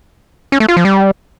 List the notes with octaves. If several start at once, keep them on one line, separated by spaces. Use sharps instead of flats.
C#4
A3
F4
F3
G3